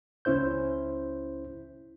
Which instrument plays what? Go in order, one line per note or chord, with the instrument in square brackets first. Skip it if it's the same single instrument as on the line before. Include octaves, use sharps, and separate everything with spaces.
[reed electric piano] C#2 C#4 E4 C5 G6